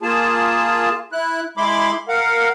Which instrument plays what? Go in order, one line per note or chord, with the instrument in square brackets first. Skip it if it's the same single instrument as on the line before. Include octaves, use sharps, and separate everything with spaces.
[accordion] A#3 F4 G#4 A5
E4 F#6
G#3 E4 B5 C6 D6
A#4 F5 F#5